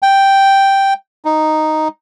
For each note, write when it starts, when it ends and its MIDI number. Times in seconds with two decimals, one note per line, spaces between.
0.02 0.94 79
1.25 1.88 63